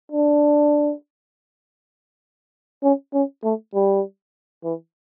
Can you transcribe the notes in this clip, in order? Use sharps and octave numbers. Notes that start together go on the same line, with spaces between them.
D4
C#4
C#4
A3
G3
E3